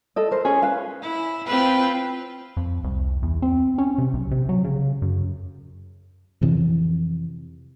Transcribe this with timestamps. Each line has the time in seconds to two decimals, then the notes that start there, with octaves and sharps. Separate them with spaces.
0.16 A4 D#5
0.31 A#4 C5
0.45 C#4 G#4
0.62 B4 F5
1.02 E4
1.47 C4 F4 B4
2.57 F2
2.84 C2
3.23 E2
3.42 C4
3.78 C#4
3.98 C3
4.14 B1
4.31 C3
4.49 F#3
4.64 C#3
5.02 F#2
6.42 F2 C3 E3